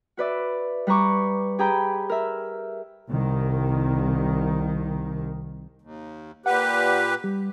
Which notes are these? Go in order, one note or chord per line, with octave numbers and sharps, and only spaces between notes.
F#4 B4 D5 E5
G3 B4 A#5 C#6 D6
G4 G#4 G5 A#5 B5 G6
A#4 E5
C2 D#3
D#2
A#2 G4 B4 F#5
G3